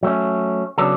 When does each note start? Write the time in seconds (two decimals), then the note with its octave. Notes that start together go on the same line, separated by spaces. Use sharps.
0.03 F#3 A3 C#4
0.78 C#3 F#3 B3 D4 A4